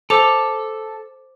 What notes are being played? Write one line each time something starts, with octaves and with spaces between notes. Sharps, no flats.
A4 C5 D6 F7